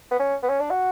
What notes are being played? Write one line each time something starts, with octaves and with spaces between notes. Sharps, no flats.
B3
C#4
B3
C#4
D4
F#4